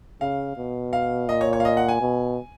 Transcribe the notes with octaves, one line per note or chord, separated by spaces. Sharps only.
C#3 F5
B2
F5
A#2 D#5
C#5
C#5
F5
D#5
F#5
G#5
B2